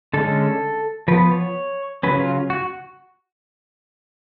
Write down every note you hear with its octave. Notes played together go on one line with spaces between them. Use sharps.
D3 G#3 C#4 A4
F3 B3 B4
C#5
C#3 F#3 C#4 B4
F4
F#4